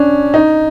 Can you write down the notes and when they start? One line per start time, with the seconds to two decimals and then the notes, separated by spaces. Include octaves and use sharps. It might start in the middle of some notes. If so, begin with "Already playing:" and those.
Already playing: C#4 D4
0.34 D#4